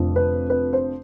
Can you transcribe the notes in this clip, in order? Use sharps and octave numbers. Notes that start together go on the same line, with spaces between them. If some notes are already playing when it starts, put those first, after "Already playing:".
Already playing: F1 F2 D3 F3
B4
B4
C5